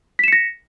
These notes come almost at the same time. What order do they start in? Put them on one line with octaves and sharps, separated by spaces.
B6 E7 C#7 A#6